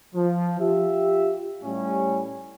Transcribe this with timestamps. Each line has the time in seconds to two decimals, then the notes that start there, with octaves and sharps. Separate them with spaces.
0.15 F3
0.60 F4 G4 E5
1.64 A2 G3 C#4